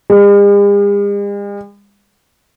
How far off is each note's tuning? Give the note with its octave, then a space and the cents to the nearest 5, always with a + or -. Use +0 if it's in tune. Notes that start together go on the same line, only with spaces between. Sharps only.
G#3 -45